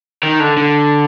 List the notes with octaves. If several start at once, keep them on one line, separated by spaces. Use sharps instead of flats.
D#3
D3
D3